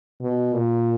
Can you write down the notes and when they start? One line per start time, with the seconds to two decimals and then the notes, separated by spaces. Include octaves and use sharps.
0.21 B2
0.54 A#2